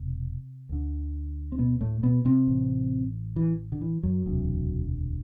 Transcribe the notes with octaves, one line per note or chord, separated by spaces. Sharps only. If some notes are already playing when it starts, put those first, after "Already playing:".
Already playing: E1 C3
D2 D3
C4
B2 B3
A2 A3
B2 B3
C3 C4
A1 A2
E3
D3
E3
F#2 F#3
E1 D2 C3